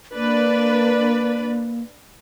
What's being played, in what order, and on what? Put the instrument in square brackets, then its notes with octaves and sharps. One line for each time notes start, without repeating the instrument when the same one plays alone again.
[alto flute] A#3 [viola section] D4 B4 D5